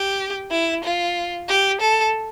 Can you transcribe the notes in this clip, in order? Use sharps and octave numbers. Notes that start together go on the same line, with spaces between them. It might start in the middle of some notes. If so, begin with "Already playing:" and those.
Already playing: G4
E4
F4
G4
A4